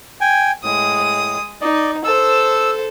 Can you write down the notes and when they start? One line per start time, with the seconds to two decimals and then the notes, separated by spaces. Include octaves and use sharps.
0.21 G5 G#5
0.63 A2 G#3 D#6
1.61 D#4 D5 D#5
2.04 A4 C5 E6